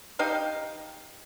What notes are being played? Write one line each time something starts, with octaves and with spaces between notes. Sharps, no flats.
D#4 G4 D#5 F5